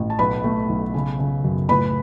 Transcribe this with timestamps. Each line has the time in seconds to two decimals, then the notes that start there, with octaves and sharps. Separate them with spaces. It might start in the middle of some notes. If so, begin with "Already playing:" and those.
Already playing: A1
0.10 A5
0.19 B1 B4 B5
0.44 A3
0.69 B1
0.94 C#3
1.19 C#3
1.44 F#2
1.69 A2 B4 B5